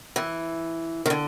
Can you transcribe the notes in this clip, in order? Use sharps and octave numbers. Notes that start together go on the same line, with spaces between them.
E3
D#3
D3